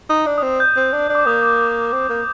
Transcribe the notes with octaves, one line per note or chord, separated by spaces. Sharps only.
D#4
D4
D#6
C4
G6
C4
D4
D4
D6
A#3 D#6
C4
A#3